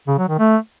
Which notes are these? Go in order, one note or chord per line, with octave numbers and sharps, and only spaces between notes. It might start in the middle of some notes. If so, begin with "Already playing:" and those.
C#3
F#3
D#3
A3